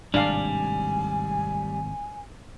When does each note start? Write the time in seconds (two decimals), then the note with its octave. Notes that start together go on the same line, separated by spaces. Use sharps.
0.14 G#1 A2 C3 G3 D4 F5 G#5